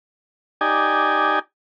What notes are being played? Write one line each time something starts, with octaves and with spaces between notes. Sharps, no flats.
D#4 G4 D5 G#5